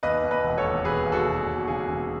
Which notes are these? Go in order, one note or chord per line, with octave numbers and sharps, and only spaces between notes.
D#2 B4 D#5
D#2
B4 D#5
E1
A4 C#5
D#2
E1 G#4 B4
D#2
F#4 A4
E1
E1
F#4
C#3 G#4
E1